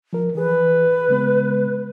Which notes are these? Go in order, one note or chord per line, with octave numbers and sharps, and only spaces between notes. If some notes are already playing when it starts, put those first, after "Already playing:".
F3 A#4
E3 G#4 B4
C#3 G#3 B3